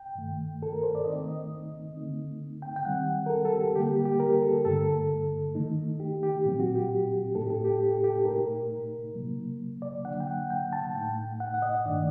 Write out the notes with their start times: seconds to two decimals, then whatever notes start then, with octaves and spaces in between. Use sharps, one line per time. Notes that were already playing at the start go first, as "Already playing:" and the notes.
Already playing: G5
0.15 G2 D#3 A3
0.62 A4
0.72 A#4
0.83 C5
0.95 D5
1.04 D#3 A3 C4 D#4 D#5
1.28 D#5
1.95 D3 A3 C4 D#4
2.62 G5
2.76 G5
2.85 D#3 G3 C4 F#5
3.26 A#4
3.30 A4
3.45 A4
3.53 G4
3.75 D3 G3 A#3 G4
3.90 G4
4.06 G4
4.20 A#4
4.42 A4
4.65 G2 D3 A3 A4
5.55 D#3 A3 D#4
6.00 G4
6.23 G4
6.45 A#2 F#3 C4
6.60 F#4
6.76 G4
7.35 A2 A3 D#4 A4
7.43 G4
7.50 A4
7.64 G4
7.80 G4
7.92 A4
8.04 G4
8.25 A#2 A3 D#4 A#4
9.15 C3 F#3 A#3
9.82 D5
10.05 D3 F#3 A#3 D4 F#5
10.20 G5
10.28 F#5
10.50 G5
10.73 A5
10.95 A2 A3 D#4 G5
11.40 F#5
11.54 F#5
11.62 D#5
11.85 G2 D#3 A3 D4 D5